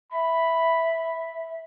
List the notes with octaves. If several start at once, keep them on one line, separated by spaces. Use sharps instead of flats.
E5 B5